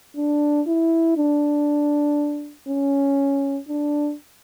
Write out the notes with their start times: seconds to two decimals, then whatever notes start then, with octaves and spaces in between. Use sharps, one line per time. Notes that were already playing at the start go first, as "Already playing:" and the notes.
0.16 D4
0.67 E4
1.17 D4
2.68 C#4
3.68 D4